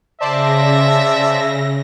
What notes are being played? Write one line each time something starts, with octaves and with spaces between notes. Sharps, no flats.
C#3 C5 D5 E5 A5 A#6